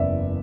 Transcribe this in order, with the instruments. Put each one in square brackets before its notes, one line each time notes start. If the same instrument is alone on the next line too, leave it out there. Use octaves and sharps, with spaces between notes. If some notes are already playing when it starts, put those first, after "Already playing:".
Already playing: [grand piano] F#1 E2 C#3 D5 E5